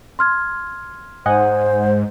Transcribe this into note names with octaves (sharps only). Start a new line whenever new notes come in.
C6 F6 G#6
G#2 C5 D#5 F#5 G#5